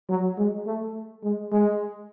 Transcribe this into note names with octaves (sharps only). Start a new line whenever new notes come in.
F#3
G#3
A3
G#3
G#3